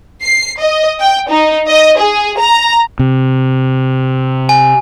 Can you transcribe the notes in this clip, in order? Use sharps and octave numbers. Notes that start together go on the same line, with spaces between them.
C7
D#5
G5
D#4
D#5
G#4
A#5
C3
G#5